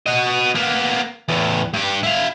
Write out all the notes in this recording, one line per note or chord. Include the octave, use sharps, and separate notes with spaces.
F#4 D#5
A#3 B3
E2 A2
G2 G4
E4 F5